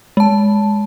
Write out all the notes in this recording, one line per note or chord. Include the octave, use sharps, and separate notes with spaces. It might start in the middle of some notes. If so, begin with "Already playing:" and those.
G#3 A5